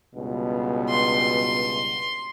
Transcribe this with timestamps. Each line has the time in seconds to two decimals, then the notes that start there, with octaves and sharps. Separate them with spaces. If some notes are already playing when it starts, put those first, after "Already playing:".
0.14 C#2 G2 B2
0.90 C6